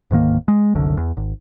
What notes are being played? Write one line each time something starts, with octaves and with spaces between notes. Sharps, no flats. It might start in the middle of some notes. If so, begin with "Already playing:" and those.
D1 G#2 D#3 A#3
G#3
F#1 C2 F#2 D3
E2
G#1